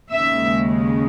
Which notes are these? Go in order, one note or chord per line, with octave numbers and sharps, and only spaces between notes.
D#2 C#3 G#3 E5